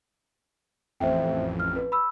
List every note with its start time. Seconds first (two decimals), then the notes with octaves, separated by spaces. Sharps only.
1.00 A1 F2 C5 E5 G5
1.60 F6
1.76 B4
1.92 B5 E6